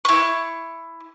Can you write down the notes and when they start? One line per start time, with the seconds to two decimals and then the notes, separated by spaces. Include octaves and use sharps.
0.05 E4 C#6